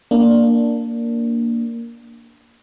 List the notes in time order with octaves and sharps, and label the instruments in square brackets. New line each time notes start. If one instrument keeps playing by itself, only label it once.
[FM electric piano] A#3 D4